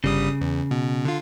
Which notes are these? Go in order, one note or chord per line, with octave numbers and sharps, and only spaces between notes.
G1 C#3 G3 D#6
E2
B2
D3 F4